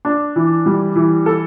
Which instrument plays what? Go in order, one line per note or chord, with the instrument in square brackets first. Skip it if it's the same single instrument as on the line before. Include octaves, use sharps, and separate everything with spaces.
[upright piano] D4
E3
G3
E3
A4